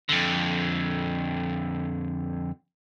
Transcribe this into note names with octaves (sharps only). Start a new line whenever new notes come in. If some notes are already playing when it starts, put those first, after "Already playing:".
F2 D3